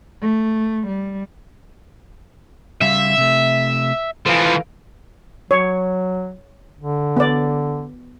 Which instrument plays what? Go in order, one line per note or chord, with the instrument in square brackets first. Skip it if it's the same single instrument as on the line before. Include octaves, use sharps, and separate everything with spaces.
[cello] A3
G3
[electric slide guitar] C#3 G3 F5 [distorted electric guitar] E5
[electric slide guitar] C3 A3
[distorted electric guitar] E3 F3 [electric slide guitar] A4 B4 F5
[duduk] F#3 [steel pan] C#5
[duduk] D3
[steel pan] B3 D5